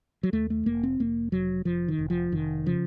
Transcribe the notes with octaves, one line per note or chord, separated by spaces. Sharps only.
F#3
D#2 A3
A3
F1 A#3
C4
F1 A#3
F1 F#3
F1 F3
D#3
F1
F3
F1 D#3
C#3 F3